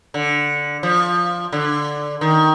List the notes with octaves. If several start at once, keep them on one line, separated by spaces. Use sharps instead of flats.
D3
F3
D3
D#3